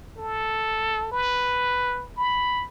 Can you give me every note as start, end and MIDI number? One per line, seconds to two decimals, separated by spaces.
0.18 1.11 69
1.12 2.07 71
2.17 2.64 83